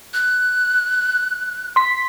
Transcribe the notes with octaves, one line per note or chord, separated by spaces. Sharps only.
F#6
C6 B6